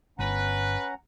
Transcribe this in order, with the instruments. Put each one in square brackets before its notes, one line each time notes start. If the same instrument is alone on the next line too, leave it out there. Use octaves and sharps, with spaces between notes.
[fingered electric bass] G1 [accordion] C#4 F#5 A#5 [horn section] B4